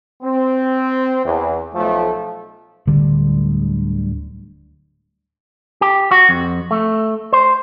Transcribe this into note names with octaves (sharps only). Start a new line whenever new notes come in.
C4
E2
B1 F3 A3
D1 D2 D3 G3
G4
F#4
F2
A3
C5